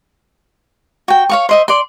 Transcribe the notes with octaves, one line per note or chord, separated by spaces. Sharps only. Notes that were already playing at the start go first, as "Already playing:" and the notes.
F#4 G5
C#5 F5 C#6
C5 D#5 E5
D5 C6